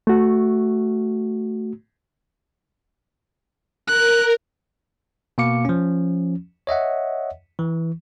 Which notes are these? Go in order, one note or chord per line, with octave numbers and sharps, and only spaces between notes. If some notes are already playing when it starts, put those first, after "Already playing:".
A3 F#4
A#4 F#6
B2 A#3 F5 D6 C#7
F3 C#4
C#5 D#5 E5 F#5
E3